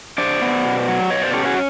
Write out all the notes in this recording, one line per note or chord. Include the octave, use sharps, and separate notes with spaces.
D4 C5 D5
B3
B2
F#3
B2 C#5 D#5
C5 D5
C#4 G4 A4
F#4 G#4